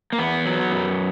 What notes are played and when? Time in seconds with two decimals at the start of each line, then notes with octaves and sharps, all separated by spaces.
0.12 A#3
0.18 E2 B3
0.45 F#3
0.72 F#2